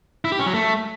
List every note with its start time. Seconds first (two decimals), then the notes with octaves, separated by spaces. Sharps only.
0.25 E4
0.32 G4
0.39 C#4
0.47 F#3
0.54 A3